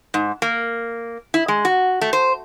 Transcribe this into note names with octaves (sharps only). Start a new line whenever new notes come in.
G#2
A#3
E4
G#3
F#4
A3
C5